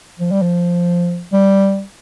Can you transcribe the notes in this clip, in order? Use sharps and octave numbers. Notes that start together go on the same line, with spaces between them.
F3
G3
F3
G3